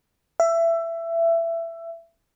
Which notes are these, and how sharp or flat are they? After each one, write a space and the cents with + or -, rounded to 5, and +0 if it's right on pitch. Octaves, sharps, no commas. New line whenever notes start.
E5 +20